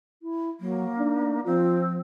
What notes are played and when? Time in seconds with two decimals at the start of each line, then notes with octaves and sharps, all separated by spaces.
0.22 E4
0.60 F#3 A#3
0.98 D4 D#4
1.46 F3 C4 F4